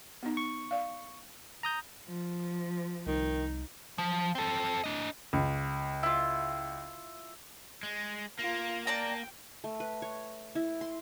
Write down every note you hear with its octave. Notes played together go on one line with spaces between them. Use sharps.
B3 D#4
C#6
D5 F5
A#5 D#6 G6
F3
C2 D#3 D#4
F3
C4 A4
D4 D#5
C#2
E4 F4
G#3
A#3 F4 A#5
D5 G5 A5 A#5
A3
B4
C#5
E4
C6